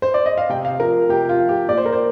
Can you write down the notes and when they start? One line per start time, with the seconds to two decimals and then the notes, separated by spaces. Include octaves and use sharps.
0.02 C5
0.14 D5
0.26 D#5
0.38 F5
0.49 C3 G5
0.65 F5
0.80 F3 A#4
1.09 C3 G4
1.29 F4
1.39 F3
1.49 G4
1.68 A#2 D5
1.77 C5
1.86 A#4
1.92 C5